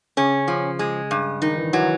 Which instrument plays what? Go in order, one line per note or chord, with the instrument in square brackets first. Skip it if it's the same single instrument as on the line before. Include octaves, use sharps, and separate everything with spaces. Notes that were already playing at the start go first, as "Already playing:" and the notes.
[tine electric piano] C#3 [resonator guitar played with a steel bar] C#4
[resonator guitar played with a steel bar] F3
G#3
G2
[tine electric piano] D#3 [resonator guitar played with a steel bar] D#4
[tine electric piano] E3
[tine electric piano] E3 [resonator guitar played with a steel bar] F#3